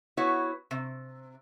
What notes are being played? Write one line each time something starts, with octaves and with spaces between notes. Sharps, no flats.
B3 E4 F#4 B4 C#5
C3